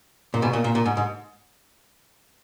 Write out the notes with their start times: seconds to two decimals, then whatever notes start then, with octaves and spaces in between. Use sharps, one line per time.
0.34 A#2
0.42 G#2 B2
0.53 A#2
0.64 A#2
0.75 A#2
0.86 G#2
0.97 G#2